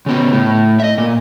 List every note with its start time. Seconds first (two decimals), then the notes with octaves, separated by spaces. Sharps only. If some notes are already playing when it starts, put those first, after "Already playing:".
0.06 C#3 B3
0.33 A2
0.80 D#5 E5
0.98 A#2